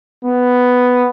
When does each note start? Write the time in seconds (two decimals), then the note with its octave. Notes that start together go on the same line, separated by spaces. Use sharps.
0.25 B3